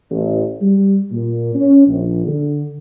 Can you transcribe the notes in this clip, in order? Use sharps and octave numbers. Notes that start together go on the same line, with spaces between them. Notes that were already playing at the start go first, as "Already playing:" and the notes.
A1
G3
A#2
C#4
A#1
D3